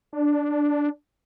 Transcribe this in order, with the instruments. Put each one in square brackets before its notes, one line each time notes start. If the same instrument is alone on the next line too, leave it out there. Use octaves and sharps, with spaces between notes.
[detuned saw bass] D4